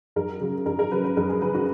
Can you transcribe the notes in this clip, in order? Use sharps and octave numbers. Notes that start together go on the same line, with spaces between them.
F#2 A#4
C#3 F#3
F#2 A#4
A#4
C#3 F#3 B4
B4
F#2 A#4
G#4
C#3 F#3 B4
F#4